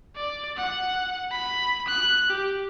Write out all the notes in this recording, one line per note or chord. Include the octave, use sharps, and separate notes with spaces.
D5
F#5
B5
F#6
G4